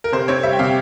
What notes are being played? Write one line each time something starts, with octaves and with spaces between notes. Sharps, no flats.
A#4
C3 C5
C4 C#5
G3 E5
G5
C3 F5